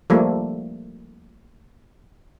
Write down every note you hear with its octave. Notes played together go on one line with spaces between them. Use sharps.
F3 G3 A3 A#3